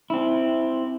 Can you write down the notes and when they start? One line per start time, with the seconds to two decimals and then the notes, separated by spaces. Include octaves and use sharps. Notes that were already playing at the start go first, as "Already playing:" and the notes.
0.10 C4 E4